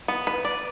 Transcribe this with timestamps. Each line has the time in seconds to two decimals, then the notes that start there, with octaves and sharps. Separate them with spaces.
0.08 B3
0.27 B4
0.45 D5